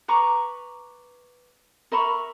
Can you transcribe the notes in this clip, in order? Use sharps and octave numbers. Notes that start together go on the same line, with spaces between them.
B4 A#5 C#6 D6
A#4 E5 B5 C#6